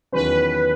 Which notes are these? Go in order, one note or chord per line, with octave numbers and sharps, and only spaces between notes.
E2 D#3 F#3 C#4 B4